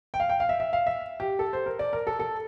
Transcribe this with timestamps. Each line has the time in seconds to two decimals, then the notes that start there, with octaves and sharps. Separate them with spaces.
0.14 G5
0.20 F5
0.29 G5
0.40 F5
0.49 E5
0.60 E5
0.73 F5
0.87 E5
1.20 G4
1.39 A4
1.53 C5
1.66 A#4
1.79 D5
1.93 A#4
2.07 A4
2.20 A4